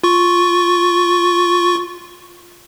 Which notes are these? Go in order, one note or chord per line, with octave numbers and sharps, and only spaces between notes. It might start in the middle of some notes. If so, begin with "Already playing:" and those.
F4 C#6